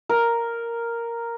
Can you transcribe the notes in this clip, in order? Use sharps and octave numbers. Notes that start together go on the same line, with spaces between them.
A#4